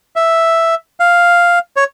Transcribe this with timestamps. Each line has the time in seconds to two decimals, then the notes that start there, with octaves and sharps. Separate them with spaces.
0.16 E5
1.00 F5
1.76 C#5